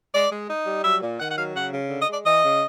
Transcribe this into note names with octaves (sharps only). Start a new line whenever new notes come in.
G#3 D5
G#3
D#4
G3
F#3 E5
A#2
D#3 F#5
F#5
F#3 F5
C#3 F#5
C#3
D3
D#5
G#3
D5
E3 D#5
C#3